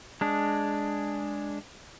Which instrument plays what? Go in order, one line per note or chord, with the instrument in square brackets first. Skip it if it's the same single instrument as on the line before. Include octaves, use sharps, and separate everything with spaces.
[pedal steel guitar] G#3 D4